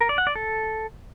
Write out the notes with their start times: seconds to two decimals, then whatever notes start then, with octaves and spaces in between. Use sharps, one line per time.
0.01 A#4
0.09 D5
0.18 F#5
0.27 D5
0.35 A4